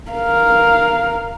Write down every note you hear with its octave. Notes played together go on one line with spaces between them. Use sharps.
A#4 F5